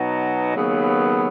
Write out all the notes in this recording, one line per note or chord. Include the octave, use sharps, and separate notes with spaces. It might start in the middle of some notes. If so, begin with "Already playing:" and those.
Already playing: B2 F#3 B3 D#4
D#2 C#3 F#3 B3